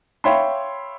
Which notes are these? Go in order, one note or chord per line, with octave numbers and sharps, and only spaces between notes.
C#5 E5 F5 G5 B5 C6